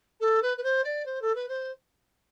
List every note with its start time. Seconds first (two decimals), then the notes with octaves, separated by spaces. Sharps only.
0.20 A4
0.42 B4
0.57 B4
0.64 C5
0.84 D5
1.06 C5
1.22 A4
1.35 B4
1.49 C5